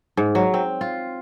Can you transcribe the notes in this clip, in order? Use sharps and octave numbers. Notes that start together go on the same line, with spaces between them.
G#2
F#3
C4
F4